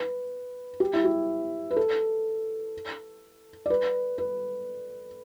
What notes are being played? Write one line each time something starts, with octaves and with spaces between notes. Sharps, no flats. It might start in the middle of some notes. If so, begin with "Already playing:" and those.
Already playing: B4
G4
E4
G4
B4
A4
D5
B4
B4